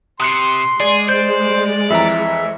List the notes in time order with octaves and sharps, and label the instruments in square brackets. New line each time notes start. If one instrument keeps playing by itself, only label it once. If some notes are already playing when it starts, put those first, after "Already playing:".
[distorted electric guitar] C3 [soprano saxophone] C6 [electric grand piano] D#6 F#6 C#7
[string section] G#3 [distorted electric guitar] G#4 [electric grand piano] D5
[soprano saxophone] C5 [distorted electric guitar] D5 [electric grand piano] G6
[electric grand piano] F2 E3 A#5 [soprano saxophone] E5